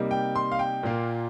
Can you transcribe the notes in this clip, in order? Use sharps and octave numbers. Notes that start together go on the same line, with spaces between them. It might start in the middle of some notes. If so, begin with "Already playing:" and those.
Already playing: C3 G3 A#3 D#4
G5
C6
F5
G5
A#2 A#3 F4